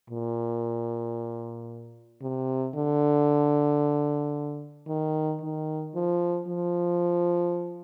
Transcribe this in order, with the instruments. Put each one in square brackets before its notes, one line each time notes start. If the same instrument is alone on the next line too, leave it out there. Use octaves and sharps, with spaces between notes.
[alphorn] A#2
C3
D3
D#3
D#3
F3
F3